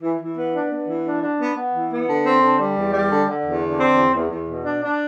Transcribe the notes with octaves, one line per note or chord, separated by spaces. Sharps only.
E3
E3
B3
D4
B3
E3
D4
D4
B3
B3
E3
B3
D3
C4
D3
G3
E2
G3
D3
D3
E2
D3
C4
E2
E2
E2
B2
D4
D4